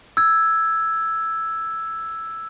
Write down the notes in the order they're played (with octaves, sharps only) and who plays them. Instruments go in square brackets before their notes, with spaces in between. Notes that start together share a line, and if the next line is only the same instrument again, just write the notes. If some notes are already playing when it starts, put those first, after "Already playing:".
[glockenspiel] E6 G#6